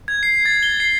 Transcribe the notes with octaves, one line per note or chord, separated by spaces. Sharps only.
G#6
C7
A6
G7
C7